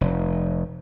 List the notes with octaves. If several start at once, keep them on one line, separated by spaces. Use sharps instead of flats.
F1